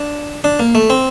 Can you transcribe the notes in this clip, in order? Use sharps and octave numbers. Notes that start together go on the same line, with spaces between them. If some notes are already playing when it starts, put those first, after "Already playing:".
Already playing: D4
D4
A#3
A3
C4